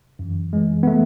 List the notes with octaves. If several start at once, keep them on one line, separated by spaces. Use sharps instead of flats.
F#2 E3
F#2 E3 G#3
B3
E3 A3